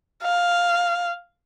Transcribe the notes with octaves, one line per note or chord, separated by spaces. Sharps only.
F5